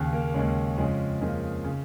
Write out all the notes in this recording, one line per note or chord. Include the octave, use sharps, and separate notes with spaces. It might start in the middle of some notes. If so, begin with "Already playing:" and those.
Already playing: D#2 C#3
A#3
D#2 C#3 G#3 C#4
F2 C#3 G#3 C#4
F2 C#3 A#3 D#4
C#3